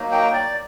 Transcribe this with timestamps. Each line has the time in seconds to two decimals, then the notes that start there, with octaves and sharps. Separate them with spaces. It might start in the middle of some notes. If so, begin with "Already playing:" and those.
Already playing: F#3 A#3 D#4
0.12 G5
0.33 D5